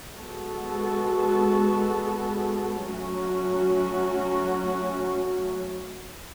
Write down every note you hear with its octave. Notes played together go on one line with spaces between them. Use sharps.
G#3 B3 F#4 A4
F#3 A3 C#4 F#4